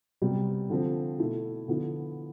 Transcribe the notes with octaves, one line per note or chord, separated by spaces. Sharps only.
C3 G3 B3
D3 F3 C4
B2 A3 E4
D3 F3 B3 E4